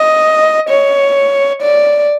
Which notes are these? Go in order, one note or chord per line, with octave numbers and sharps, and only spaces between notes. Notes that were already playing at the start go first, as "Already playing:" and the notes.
Already playing: D#5
C#5
D5